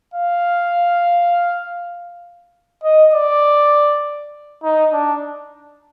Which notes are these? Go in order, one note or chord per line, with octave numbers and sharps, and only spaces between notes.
F5
D#5
D5
D#4
D4